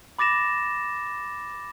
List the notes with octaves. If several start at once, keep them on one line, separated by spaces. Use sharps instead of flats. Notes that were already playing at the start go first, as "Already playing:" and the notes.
B5 D6 A6 A#6 E7